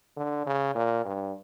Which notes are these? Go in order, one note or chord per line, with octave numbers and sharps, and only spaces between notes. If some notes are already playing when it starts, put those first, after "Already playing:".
D3
C#3
A#2
G2